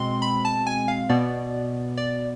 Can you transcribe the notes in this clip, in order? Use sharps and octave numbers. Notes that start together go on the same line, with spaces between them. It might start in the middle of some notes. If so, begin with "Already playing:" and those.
Already playing: B2 G#3 C4 C6
B5
A5
G#5
F5
B2 B3 D5
D5